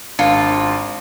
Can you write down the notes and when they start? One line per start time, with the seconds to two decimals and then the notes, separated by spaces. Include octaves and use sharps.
0.19 G#1 D4 F4 C#7